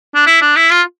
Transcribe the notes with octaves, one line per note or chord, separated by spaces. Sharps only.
D4
E4
D4
E4
F4